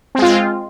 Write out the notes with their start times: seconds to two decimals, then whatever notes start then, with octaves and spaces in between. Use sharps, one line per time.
0.15 C4
0.18 G#3
0.22 F4